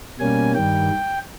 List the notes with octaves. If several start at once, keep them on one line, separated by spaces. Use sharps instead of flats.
B2 G3 A#3 C#4 G#5
G2 D#3 G3 G5